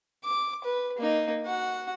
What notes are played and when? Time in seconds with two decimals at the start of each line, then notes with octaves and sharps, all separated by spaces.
0.24 D6
0.64 B4
0.97 A#3 D#4
1.46 F#4 F#5